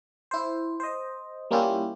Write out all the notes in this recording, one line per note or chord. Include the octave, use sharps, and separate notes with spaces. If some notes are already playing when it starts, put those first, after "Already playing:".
E4 C5
C5 D#5
G3 A#3 C#4 E4 F4 G4